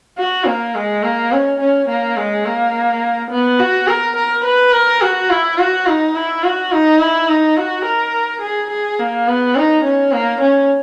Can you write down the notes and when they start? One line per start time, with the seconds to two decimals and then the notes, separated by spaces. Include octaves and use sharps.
0.18 F#4
0.46 A#3
0.75 G#3
1.03 A#3
1.32 C#4
1.60 C#4
1.89 A#3
2.17 G#3
2.45 A#3
3.31 B3
3.59 F#4
3.87 A#4
4.16 A#4
4.45 B4
4.72 A#4
5.01 F#4
5.30 E4
5.58 F#4
5.87 D#4
6.15 E4
6.43 F#4
6.72 D#4
7.00 E4
7.29 D#4
7.57 F#4
7.85 A#4
8.42 G#4
8.70 G#4
8.99 A#3
9.27 B3
9.56 D#4
9.84 C#4
10.12 A#3
10.41 C#4